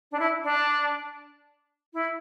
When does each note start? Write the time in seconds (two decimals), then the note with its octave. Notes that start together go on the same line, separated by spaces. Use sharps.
0.11 D4
0.19 E4
0.43 D4
1.93 E4